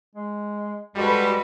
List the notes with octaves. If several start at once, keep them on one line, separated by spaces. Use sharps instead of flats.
G#3
G3 G#3 F#4 A4 B4